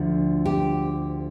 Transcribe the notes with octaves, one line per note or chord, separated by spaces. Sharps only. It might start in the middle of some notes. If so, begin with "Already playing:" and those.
Already playing: D2 D3 F3
G4